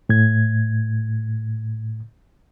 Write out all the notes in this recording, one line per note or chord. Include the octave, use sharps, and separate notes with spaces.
A2 G#6